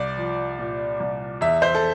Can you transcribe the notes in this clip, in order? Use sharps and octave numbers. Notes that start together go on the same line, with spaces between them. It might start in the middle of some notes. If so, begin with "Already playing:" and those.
Already playing: C2 D5
F3
A#2
C2
E2 E5
C5
A4